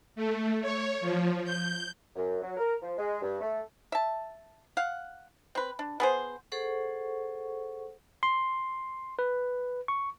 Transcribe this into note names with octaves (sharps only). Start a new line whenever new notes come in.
A3
C#5
F3
G6
F#2
F#3
A#4
F3
G#3
G2
A3
E5 A5
F5 F#5
C4 B4
D4
B3 G#4 C5
G#4 A4 C5 F#5 C#6
C6
B4
C#6